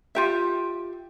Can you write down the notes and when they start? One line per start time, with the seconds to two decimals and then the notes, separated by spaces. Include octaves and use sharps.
0.15 F4 G4 E5